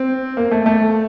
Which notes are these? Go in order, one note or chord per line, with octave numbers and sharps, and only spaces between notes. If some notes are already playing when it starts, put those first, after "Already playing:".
Already playing: C4
A#3
A3
A3